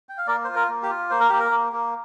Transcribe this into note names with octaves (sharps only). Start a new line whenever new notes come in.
G5
F5
A#3 A#4 D5
F4 C5
A#4
A#3
G4
F4
A#3 C5
A#4
A#3 G4
A#4
A#3
A#3